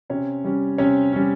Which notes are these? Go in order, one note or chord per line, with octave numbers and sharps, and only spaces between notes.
C3 C#4 C#5
G3 C#4
C3 C#4 C#5
G3 C#4